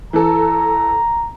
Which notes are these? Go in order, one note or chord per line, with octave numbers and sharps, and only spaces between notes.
E3 A4 A#5